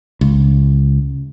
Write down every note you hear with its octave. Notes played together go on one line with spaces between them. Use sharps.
C#2